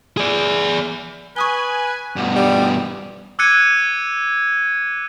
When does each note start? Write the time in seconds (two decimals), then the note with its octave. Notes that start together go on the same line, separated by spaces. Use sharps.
0.17 G#4 D5
1.36 B4 G#5 C#6 D#6 G7
2.16 G2 B2
2.36 G3
3.39 D6 E6 F#6 G#6 C#7 D#7